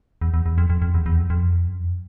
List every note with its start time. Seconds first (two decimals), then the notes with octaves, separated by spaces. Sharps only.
0.21 E2
0.34 E2
0.46 E2
0.58 F2
0.70 F2
0.82 F2
0.94 E2
1.06 E2
1.19 F2
1.30 F2
1.67 F#2
1.79 F2